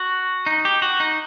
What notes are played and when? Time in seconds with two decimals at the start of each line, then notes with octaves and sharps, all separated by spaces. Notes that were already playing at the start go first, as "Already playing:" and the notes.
Already playing: F#4
0.46 D#4
0.65 G4
0.82 F#4
1.00 D#4